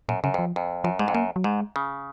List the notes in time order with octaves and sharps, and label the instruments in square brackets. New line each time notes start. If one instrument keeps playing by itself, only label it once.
[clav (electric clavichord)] F#2 [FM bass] A#2
[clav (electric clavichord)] F#2 [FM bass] C#3
[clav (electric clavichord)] F2 [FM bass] F3
[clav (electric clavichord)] F2
[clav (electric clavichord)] F#2 [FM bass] F3
[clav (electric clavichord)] G#2 [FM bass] G#3
[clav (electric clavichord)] F2
[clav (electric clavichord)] F#2 [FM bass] A#3
[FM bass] F#3
[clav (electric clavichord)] G#2 [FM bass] G#3
[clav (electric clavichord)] C#3